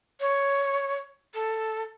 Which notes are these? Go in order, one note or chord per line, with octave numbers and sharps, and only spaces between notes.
C#5
A4